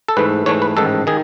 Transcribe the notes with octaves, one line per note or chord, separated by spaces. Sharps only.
A4
G#2 E3 A3 B4
G#2 E3 A3 C#5
B4
A1 G#2 D#3 A4
D#3 G#4